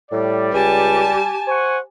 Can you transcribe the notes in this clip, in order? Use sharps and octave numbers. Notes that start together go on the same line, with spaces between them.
A2 G3 D5
C#2 G4 G#5 A5
C5 F#5 G#5 C#6